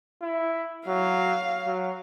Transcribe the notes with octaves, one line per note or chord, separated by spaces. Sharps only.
E4
F#3 F5
F#3